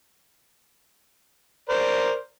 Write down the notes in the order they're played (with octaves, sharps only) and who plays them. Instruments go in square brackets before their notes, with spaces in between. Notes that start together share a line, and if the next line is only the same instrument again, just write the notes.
[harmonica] A#4 C5 D5